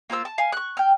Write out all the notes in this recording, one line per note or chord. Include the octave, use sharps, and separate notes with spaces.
A#3 F4 C5 E6
A5
F5 G#5
C#6 F#6
G5 F6